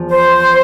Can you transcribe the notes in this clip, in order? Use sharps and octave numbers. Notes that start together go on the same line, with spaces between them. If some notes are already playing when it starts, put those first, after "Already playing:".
Already playing: E2 F3
C5